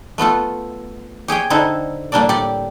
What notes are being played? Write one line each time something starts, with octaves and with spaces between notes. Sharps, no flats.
A3 B3 F4 A4
G4 G#4 C#5 G5
D3 C4 D#4 E4 A4
A2 G3 A#3 D4 A4 D5
G4 D5